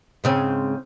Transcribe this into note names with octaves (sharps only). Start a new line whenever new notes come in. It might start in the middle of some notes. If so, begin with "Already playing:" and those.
G#2 C#3 C4